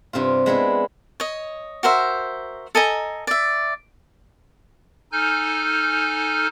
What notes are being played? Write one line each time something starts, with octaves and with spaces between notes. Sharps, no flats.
G2 C3 C4 F4
G#3 B3 D4 E4
C#5 D#5
F#4 A#4 C5 E5
A4 D#5 G#5 A#5
D5 E5
D#4 A4 G#5 F6 G6